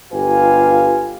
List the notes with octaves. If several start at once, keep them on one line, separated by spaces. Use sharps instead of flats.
G1 F4 G4 B4 F5 G#5